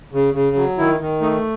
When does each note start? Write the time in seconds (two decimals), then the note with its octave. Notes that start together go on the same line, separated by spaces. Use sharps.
0.13 C#3
0.34 C#3
0.56 F#3
0.78 D#3 E4
1.00 D#3
1.21 A3 D#4